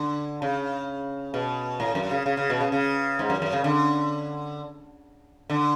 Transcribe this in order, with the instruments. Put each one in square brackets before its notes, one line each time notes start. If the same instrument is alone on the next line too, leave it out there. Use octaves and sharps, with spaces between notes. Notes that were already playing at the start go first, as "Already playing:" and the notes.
Already playing: [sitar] D3
C#3
B2
A2
F#2
C#3
C#3
C#3
B2
C#3
C#3
G#2
F#2
F#2
C#3
D3
D3